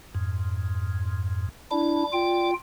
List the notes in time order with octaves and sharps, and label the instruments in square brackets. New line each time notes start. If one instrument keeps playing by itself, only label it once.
[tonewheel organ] F2 G#2
[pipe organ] D4 E4 [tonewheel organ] D5
[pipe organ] F4 G5